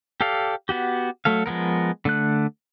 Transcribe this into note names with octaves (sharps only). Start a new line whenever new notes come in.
G4 A4 D5 F5
B3 F#4 G4
F#3 A3 A4 F5
F3 G#3 B3 A#4
D3 A3 F#6